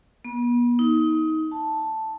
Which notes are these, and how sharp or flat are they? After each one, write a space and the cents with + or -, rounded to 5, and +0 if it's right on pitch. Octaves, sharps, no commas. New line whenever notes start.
B3 -35
D#4 +25
A5 +0